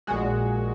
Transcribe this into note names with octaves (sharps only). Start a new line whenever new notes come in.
A#1 A#2 G#3 F#4